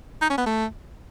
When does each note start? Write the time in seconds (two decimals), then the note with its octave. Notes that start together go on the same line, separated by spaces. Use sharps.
0.22 D#4
0.30 C#4
0.38 B3
0.46 A3